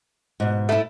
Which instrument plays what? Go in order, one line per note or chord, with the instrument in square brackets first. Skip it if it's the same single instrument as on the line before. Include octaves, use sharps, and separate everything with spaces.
[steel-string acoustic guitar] G#2 B2
[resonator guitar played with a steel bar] A3 E4